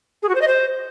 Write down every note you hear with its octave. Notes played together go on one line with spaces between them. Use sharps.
G#4
F#4
C5
D#5
C5